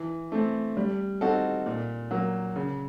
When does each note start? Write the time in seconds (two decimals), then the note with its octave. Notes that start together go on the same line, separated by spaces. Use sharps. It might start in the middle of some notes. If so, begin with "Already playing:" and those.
Already playing: E3
0.32 A3 C4
0.77 G3
1.21 C4 D#4 F#4 A4
1.66 A#2
2.11 F#3 A#3
2.56 C#3